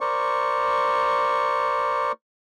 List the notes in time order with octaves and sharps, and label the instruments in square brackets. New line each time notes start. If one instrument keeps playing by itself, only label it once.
[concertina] A#4 C5 D5 C#6